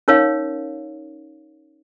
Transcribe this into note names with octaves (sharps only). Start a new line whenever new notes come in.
C#4 D#4 A#4 C#5 F5